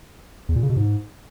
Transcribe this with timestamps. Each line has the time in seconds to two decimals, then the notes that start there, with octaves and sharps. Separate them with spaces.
0.49 E2
0.56 A#2
0.63 C#3
0.70 B2
0.76 G#2